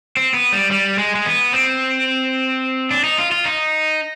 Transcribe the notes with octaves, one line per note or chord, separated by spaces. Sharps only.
C4
B3
G3
G3
G#3
G#3
B3
C4
D4
D#4
F4
F4
D#4